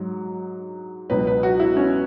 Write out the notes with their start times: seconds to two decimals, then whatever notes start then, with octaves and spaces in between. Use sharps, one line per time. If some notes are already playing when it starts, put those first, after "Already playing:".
Already playing: G#2 F#3
1.09 C#2 B2 F#3 B4
1.27 B4
1.43 F#4
1.60 E4
1.76 C#4